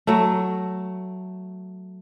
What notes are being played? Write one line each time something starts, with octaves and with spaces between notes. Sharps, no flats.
F#3 A3